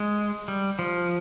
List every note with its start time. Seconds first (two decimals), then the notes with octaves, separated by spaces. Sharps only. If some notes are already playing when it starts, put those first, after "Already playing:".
Already playing: G#3
0.48 G3
0.79 F3